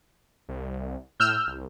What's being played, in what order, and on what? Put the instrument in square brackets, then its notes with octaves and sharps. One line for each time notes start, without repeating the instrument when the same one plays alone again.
[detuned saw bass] C2
[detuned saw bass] A2 [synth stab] E6 F6 G6
[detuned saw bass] C2